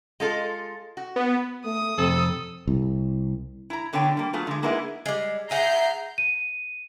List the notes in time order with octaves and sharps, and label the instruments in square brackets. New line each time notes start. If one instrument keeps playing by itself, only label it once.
[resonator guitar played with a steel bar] G#3 F4 A4
F#4
[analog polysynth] B3
[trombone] A3 [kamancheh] D#6
[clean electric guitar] F2 C3 [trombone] C4 [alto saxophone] A4
[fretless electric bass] C2
[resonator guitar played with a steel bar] E4 A#5
B2 D3 B3 C#5 G5
G3 A#3
F#3 A3 B3 F4 G#4
D3 G#3
G#3 A#3 B3 D#4 E4 G#4
[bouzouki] G3 G#3
[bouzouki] G#4 F#5 [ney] E5 [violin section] A#5 G6 C7
[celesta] D#7